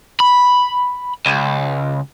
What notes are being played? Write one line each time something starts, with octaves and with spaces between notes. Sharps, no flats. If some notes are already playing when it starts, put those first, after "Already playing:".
B5
C#2